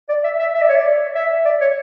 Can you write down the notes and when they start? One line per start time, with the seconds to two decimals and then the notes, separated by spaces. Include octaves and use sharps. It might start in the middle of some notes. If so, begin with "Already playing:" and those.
0.09 D5
0.24 E5
0.39 E5
0.54 E5
0.61 D5
0.69 C#5
0.76 D5
1.15 E5
1.45 D5
1.61 C#5